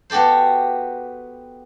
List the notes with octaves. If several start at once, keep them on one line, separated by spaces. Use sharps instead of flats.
B3 F#4 G4 A4 C5